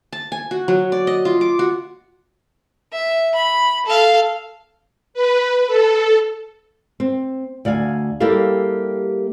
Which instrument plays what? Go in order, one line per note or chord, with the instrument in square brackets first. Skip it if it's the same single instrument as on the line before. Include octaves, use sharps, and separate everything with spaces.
[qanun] A5
G#5
F#4
F#3
D5
D#5
F4
D6
F#4
[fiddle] E5
B5
A4 F5
[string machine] B4
A4
[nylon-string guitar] C4
D2 D5 F5 G#5
G3 A#3 E4 G4 A4 F5